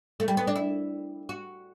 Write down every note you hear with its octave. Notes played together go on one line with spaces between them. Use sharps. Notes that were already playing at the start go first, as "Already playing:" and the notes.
A3
G3
B3
D4
E4
F#4